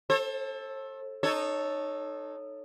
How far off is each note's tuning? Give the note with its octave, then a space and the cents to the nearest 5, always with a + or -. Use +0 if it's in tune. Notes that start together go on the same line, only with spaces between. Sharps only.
A4 +0 C5 +45
D#4 -20 A4 +0 C#5 +0